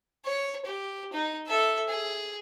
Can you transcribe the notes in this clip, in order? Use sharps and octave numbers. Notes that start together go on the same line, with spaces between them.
C#5
G4
D#4
A4 E5
G#4